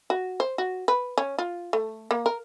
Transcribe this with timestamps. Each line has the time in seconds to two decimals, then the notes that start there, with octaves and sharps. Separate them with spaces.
0.10 F#4
0.40 C5
0.58 F#4
0.88 B4
1.18 C#4
1.38 F4
1.73 A3
2.11 A#3
2.26 A#4